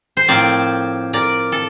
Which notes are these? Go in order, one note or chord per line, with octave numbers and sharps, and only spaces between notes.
C5
A2 F3 C4 A#4 D5
A#4 D5
A4